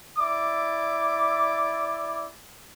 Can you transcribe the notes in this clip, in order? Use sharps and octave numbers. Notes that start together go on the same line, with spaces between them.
E4 D5 D6